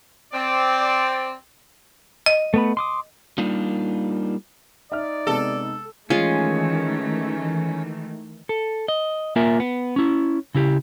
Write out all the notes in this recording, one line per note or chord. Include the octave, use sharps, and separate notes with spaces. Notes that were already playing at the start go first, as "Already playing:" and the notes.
C4 D5
D#5
A3 B3 B5
C6 D6 D#6
G3 A#3 D4 D#4 F4
D#4 D5 E5 F6
C3 G#3 B3 A4
D#3 E3 G#3 A3 C#4 F4
A4
D#5
A#3 F4 A#4 E5 G#5
B3
C#4 E4
C#3 E4 G4